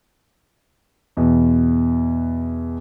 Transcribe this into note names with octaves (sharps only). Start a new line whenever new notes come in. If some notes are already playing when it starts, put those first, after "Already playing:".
E2 B2